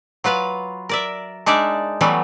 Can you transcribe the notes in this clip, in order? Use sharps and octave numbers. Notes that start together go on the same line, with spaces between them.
F#3 F4 B4 F5
A#4 D5 E5
G#3 D4 D#4 D5 E5
E3 F#3 G3 A3 B3